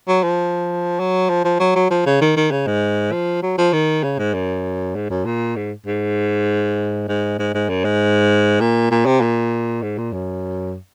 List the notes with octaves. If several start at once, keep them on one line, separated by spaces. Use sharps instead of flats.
F#3
F3
F#3
F3
F3
F#3
F#3
F3
C#3
D#3
D#3
C#3
G#2
F3
F#3
F3
D#3
C#3
G#2
F#2
G#2
F#2
A#2
G#2
G#2
G#2
G#2
G#2
F#2
G#2
A#2
A#2
C3
A#2
G#2
A#2
F#2